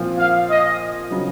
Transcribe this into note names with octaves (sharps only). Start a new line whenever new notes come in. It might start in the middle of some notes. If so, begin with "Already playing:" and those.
Already playing: A#2 F3 C4 F4
F5
D#5
C#3 F#3